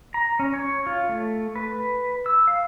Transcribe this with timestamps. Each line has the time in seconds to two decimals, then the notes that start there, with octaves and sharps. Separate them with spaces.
0.14 A#5
0.39 C#4
0.54 C#5
0.87 F4
1.09 A3
1.56 B4
2.26 E6
2.48 F5